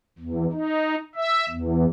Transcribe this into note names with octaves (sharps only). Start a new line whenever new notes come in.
E2
D#4
E5
E2